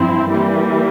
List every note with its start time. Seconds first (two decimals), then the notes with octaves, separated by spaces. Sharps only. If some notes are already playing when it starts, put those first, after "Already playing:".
Already playing: G2 F3 C4 E4
0.30 E3 G3 A#3